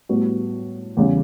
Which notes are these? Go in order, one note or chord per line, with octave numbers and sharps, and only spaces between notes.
A2 G3 B3 F#4
E2 C#3 G3